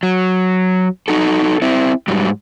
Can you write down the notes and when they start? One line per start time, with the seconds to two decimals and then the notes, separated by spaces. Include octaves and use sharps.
0.03 F#3
1.08 D#4 F#4 A4
1.62 C4 E4
2.08 G#2 F#3 G3